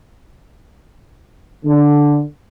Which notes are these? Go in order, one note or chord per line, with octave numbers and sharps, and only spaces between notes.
D3